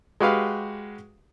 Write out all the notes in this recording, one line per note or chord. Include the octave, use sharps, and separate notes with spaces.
G#3 F#4 G4 B4 F5